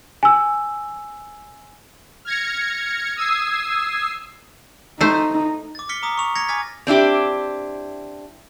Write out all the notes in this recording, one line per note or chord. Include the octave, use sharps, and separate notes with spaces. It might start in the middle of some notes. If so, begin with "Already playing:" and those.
G#5 E6
F6 G#6 A#6 C#7
D#6 E6 G#6 C7
A3 D#4 C5
D6 A6
F6 B6 C#7 G7
A#5 D6 D#6
C#6 D#6 F7
G#6 A#6 C#7 F7
G#5 D6 F6 G#6 A6 B6
C4 D4 E4 G4